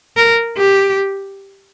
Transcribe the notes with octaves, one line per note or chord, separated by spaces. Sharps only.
A#4
G4